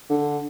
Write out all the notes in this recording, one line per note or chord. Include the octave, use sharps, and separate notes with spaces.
D3